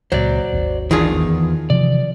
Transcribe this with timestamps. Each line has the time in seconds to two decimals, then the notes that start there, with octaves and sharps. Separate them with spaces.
0.12 C#2 A#2 F#3 C5 D5
0.53 G#1 D#2
0.91 D#3 E3 D4 F4 G#4
1.12 E2
1.70 C3 E3 F3 D5